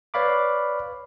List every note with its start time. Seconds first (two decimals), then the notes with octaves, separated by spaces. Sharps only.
0.14 B4 C#5 D5 F5 B5 D6